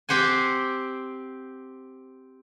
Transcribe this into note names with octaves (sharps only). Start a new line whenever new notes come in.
C4 G4 C5 F#5 G#5